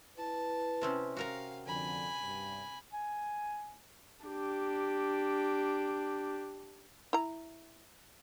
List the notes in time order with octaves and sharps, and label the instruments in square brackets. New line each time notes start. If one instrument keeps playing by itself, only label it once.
[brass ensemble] E4 B4 [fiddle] A5
[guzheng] C3 C4 C#4
[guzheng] F#4 A#4 A#5 [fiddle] F5
[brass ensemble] F2 D3 [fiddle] G#5 B5
[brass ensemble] G2
[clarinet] G#5
[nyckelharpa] D4 G4
[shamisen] E4 A#5